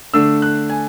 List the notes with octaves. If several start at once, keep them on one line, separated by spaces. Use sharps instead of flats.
D3 A3 D4 E6
F#6
G#5